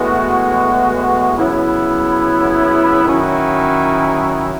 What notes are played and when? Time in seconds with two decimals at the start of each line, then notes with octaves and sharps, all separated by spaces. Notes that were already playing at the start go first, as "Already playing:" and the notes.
Already playing: A2 E3 G#3 B3 F#4
1.36 C#3 F#3 B3 E4
3.05 D#3 F#3 C#4 E4